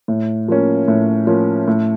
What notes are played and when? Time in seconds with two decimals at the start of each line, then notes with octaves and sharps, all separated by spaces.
0.08 A2
0.48 F3 A#3 C#4
0.88 A2
1.27 F3 A#3 C#4
1.68 A2